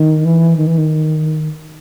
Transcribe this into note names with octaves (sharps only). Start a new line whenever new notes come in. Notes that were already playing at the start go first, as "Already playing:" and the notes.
Already playing: D#3
E3
D#3
E3
D#3